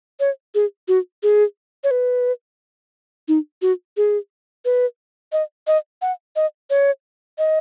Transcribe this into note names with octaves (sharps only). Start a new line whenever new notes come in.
C#5
G#4
F#4
G#4
C#5
B4
D#4
F#4
G#4
B4
D#5
D#5
F#5
D#5
C#5
D#5